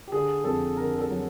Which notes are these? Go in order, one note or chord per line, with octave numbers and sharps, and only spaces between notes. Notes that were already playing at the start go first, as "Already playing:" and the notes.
G4
D3 G#4
F2 A4
D3 A#4
A4
F#3